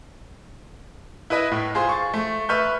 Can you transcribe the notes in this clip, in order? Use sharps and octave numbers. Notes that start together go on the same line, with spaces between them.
E4 B4 D#5 E5
A2
F4 G#4 C5 C6
C#6 A6
A3
B4 E5 C#6 F6 G6